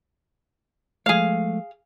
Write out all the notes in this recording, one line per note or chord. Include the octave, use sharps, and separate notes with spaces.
F3 G#3 A3 G#4 F5